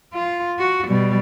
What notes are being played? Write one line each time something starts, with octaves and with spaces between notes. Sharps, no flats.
F4
F#4
B2 G3